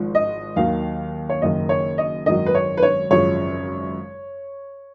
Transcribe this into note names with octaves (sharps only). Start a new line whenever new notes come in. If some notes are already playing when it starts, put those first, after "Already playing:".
Already playing: G#1 G#2 F3
D#5
D#2 D#3 F#3 F5
C#5
F#1 F#2 D#3 D#5
C#5
D#5
G#1 F#2 D#3 F#3 D#5
B4
C#5
B4
C#5
G#1 F#2 C#3 F3 C#5